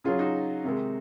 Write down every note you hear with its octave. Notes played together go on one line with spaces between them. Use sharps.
C#3 F#3 F4 G#4
D#4 F#4
C3 D#3 G#3